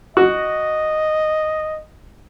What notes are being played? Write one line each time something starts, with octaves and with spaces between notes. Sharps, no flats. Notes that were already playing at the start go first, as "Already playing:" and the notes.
F#4 D#5